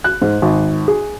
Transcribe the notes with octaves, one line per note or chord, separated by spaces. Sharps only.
F#6
G#2
G#1
G#4